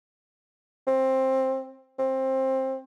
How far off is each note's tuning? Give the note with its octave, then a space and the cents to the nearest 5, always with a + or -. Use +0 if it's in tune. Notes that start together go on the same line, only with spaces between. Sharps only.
C4 +15
C4 +20